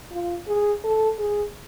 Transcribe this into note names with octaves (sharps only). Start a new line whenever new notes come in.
F4
G#4
A4
G#4